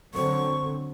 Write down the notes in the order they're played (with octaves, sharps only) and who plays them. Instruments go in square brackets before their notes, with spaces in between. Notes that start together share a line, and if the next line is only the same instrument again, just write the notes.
[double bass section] D3 F#3 C4 [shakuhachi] C#6